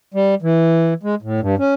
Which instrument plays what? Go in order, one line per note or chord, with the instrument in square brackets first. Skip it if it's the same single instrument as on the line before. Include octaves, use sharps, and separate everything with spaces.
[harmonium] G3
E3
G#3
A2
G2
C#4